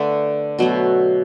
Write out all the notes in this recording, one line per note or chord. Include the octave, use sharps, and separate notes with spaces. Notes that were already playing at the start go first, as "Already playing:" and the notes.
Already playing: D3 A3 B4 D5
B2 F#3 A3